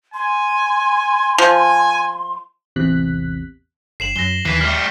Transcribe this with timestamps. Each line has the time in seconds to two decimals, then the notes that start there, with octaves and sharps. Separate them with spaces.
0.14 G#5 C6
1.38 F3 G#5
2.76 A1 E2 C3 F#6 B6
4.00 G1 C7 E7 F#7
4.16 F#2 A#6 G7
4.45 D#2 E3 B6 C7
4.61 G3 A3 F6